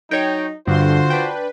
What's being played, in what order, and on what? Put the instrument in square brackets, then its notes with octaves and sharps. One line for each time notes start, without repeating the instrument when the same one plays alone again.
[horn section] F#3 D#4 [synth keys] C#5 G5
[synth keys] G2 [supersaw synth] D3 C6 [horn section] F4 F#4 C5
[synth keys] D4 G5 [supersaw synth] B4